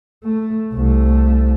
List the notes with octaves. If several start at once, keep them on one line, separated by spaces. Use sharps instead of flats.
A3
C2 A3